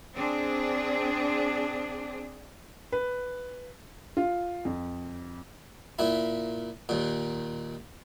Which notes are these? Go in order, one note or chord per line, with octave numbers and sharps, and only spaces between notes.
C4 D4 G#4
B4
F4
F2
A#2 E4
D#2 A#2